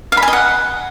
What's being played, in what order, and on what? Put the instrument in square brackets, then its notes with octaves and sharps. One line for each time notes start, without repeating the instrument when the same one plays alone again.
[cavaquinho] F5
B5
G#5
D#5
F#5